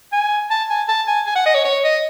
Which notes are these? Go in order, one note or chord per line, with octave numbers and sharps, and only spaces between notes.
G#5
A5
G#5
A5
G#5
G#5
F#5
D#5
C#5
C#5
D#5